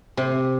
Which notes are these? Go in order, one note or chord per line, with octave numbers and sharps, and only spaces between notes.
C3